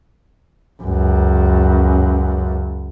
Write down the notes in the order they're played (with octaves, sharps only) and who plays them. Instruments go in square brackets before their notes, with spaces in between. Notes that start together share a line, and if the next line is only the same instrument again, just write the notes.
[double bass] C#2 F#2